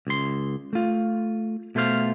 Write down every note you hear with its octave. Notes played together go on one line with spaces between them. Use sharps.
C#2 C6
A3 F4
B2 A3 F4 C5 F5